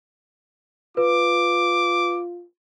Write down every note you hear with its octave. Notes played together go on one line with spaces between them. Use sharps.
F4 B4 D6